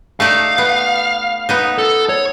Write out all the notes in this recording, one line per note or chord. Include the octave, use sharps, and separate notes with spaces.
A3 D#4 D5 F5
B3
B3 D#4
A4
C#5